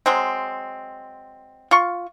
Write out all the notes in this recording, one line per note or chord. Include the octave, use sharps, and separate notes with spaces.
F#3 G#3 C4
F4 C#6